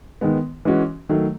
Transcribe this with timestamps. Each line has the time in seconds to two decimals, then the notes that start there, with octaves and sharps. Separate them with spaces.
0.21 D#3 G#3 B3
0.65 E3 G#3 C#4 F#4
1.09 D#3 F#3 A3